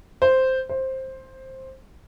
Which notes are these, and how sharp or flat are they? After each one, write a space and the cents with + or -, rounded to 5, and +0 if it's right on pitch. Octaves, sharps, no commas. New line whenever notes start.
C5 -5
C5 +10